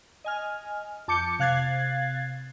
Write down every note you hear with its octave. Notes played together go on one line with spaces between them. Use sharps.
D#5 G#5 F6
F2 A5 D6 G6 C#7
C3 F5 F#6 G#6 A6 C7